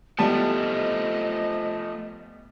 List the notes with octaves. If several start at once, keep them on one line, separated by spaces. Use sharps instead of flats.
E3 F3 G3 A3 B3 D#5 A5